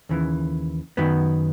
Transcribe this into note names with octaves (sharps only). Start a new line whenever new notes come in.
D#2 C#3 E3
F#2 D#3 F#3 B3